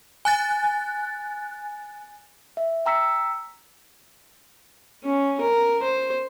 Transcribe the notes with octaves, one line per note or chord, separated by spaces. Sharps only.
G#5 F#6 A6
E5
G5 A#5 E6 B6 C#7
C#4
A#4
C5